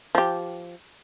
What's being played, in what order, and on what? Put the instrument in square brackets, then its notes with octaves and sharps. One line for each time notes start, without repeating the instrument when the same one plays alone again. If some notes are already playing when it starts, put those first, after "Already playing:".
[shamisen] F3 G4